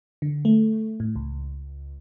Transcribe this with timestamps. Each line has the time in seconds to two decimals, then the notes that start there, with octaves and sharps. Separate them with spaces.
0.22 D3
0.45 A3
1.00 A2
1.16 C#2